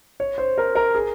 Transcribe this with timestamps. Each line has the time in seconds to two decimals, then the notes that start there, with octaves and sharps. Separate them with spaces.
0.20 C#5
0.38 C5
0.58 A#4
0.75 A#4
0.95 G#4